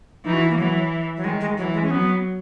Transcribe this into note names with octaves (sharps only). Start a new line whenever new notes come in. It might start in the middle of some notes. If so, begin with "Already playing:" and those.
E3 D#4
F#4
E4
A#3
E3 F#3
F#3
D#3 G#3
G#3
E3 F#3
G#3
C#4
F#3 B3